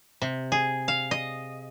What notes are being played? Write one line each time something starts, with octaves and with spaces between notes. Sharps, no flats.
C3
G#4
F5
D#5